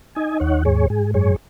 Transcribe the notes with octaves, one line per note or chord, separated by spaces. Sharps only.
D#4 D#5 G#5
D#2 C#5 F#5
G#2 G#4 C#5
G#2 G#4
F#2 G#4 C#5